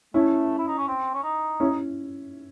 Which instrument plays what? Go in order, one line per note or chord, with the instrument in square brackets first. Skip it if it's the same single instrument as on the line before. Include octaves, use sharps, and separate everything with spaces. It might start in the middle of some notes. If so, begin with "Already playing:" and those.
[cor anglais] A3 [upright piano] C#4 E4
[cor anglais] E4
D#4
C#4
C4
C#4
D#4
[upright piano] C#4 E4